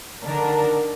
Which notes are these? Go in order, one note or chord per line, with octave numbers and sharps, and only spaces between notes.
D3 D#3 D4 A#4